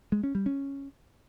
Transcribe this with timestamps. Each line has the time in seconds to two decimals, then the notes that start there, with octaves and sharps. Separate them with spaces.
0.12 G#3
0.23 C#4
0.35 G3
0.46 C#4